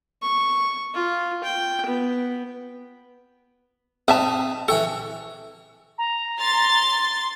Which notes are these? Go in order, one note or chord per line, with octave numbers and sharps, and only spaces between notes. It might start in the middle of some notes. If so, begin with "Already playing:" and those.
C#6
F4
G5
B3
C4 D#4 B4 E5 A5
E3 A4 G5 C#6
A#5
C6 A6